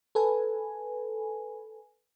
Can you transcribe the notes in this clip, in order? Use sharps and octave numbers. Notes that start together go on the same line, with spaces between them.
A4 B4 G#5